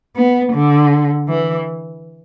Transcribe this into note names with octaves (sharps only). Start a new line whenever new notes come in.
B3
D3
E3